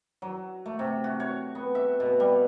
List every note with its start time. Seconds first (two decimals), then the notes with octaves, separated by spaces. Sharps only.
0.22 F#3
0.66 A3
0.79 C3
1.04 F#4
1.20 C#5
1.55 B3
1.75 E5
2.00 B2
2.20 G3